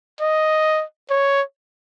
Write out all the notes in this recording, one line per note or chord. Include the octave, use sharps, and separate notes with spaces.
D#5
C#5